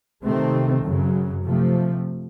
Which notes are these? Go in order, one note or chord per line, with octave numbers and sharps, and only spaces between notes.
C3 D#3 A3 C4
F#2 C#3 F#3
C3 F3 A3